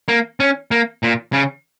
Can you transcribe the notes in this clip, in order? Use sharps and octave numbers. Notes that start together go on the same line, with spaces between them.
A#3
C#4
A#3
A#2
C#3